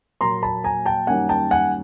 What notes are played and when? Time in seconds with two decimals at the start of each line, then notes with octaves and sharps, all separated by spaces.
0.21 A#2 F#3 A#3 A#5 C6
0.43 A5 B5
0.64 G#5 A#5
0.86 G5 A5
1.07 F#2 D#3 G3 A#3 C#4 F#5 G#5
1.29 G5 A5
1.51 F#5 G#5